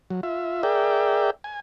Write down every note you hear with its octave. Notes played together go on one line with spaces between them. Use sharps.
F#3
F4 E5
G#4 A#4 D5 E5 G5
G#5